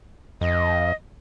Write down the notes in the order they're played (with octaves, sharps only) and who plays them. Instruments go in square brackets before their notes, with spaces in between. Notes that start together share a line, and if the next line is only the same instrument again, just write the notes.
[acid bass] F2 [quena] D#5